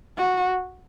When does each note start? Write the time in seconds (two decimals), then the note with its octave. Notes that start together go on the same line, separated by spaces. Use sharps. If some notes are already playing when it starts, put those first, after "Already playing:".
0.17 F#4